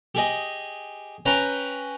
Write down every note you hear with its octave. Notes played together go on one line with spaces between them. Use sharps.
G4 G#4 D#5
C#4 B4 G5 A#5